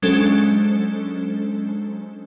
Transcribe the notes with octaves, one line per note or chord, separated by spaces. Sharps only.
F#3 G#3 C#4 D4 A4 C5